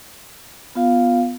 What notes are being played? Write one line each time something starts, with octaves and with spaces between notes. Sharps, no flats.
B3 F4 F5